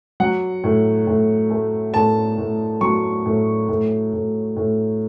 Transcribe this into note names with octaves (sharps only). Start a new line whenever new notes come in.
F#3 F#5
A2
A2
A3
A2 A5
A2
F#3 C#6
A2
A2
A2
A2